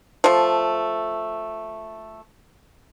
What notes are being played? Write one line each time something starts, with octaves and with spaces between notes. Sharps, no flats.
F3 A3